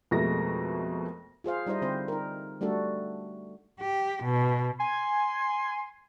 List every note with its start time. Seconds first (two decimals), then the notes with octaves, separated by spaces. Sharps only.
0.11 F2 B2 G#3 A3 A#4 A#6
1.44 F4 G#4 C5 F5
1.66 G3 D#4 E4 C5 D#5
1.82 D3 C4 G4 C5
2.08 D#4 A#4
2.61 G3 A3 D4 F#4 A4
3.81 G4
4.24 B2
4.80 G#5 C6